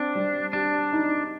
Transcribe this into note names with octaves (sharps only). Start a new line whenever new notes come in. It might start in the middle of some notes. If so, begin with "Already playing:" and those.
Already playing: C4 D4
G3
D4 G4
D#4